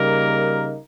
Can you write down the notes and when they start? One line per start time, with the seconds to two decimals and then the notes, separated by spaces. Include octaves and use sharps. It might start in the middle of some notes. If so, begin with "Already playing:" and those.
Already playing: C#3 G3 A#3 D#4 A#4